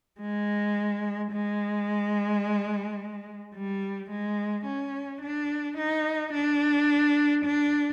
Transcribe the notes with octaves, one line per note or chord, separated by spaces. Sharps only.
G#3
G#3
G3
G#3
C#4
D4
D#4
D4
D4